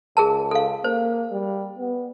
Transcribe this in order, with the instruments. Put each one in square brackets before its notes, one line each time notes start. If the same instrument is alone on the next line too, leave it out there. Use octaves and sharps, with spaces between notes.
[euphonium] C#2 [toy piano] G#4 A#4 A5
[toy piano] A4 F5
[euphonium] A#3 [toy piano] C5
[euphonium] G3
B3